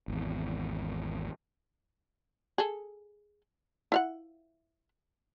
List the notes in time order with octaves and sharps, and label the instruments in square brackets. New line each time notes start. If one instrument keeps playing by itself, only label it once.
[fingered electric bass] G#1 E2
[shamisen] G#4 A4
E4 F5 F#5